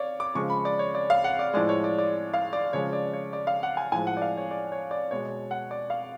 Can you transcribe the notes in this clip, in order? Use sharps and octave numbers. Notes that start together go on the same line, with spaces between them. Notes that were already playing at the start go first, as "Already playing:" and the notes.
Already playing: C#5 D5 F5
D6
C#3 F3 G#3 C#6
B5
D5
C#5
D5
F5
F#5
D5
A2 F3 G#3 D5
C#5
D5
D5
F5
D5
C#3 F3 G#3 C#5
D5
C#5
D5
F5
F#5
G#5
A2 F3 G#3 G#5
F#5
D5
F5
C#5
D5
C#5
D5
B2 G#3 C#5
F#5
D5
F5